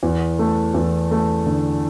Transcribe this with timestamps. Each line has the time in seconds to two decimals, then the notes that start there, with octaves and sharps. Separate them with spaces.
0.03 E2
0.39 A3
0.74 E2
1.11 A3
1.46 D3